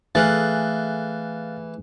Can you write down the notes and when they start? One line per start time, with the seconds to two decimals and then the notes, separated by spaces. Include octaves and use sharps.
0.15 E3 A3 G#4 F5 F#6 A6